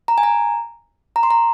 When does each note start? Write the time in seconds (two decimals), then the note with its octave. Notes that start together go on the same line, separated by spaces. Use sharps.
0.08 A#5
0.18 G#5
0.23 A#5
1.16 A#5
1.23 C6
1.30 A#5